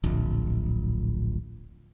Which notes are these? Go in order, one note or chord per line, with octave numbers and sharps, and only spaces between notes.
D1 A#1